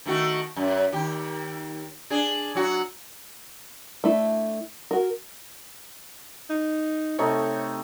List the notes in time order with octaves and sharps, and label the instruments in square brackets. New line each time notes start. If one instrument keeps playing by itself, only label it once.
[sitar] D#3 A3 F#4
F#2
D#2 G4
D4 G#4
F#3 F#4
[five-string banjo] A3 D4 E4
F#4 A#4
[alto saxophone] D#4
[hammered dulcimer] C3 A3 D#4 [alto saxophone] C#5